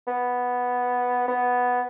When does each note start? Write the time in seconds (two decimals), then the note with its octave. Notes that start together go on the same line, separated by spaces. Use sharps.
0.08 B3
1.28 B3